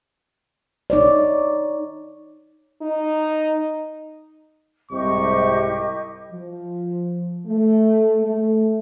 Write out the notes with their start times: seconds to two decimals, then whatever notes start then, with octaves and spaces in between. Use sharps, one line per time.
0.90 D#4 C#5 D5
2.82 D#4
4.92 C2 G#2 C3 E4 G4 D#5 C#6
6.31 F3
7.47 A3
8.24 A3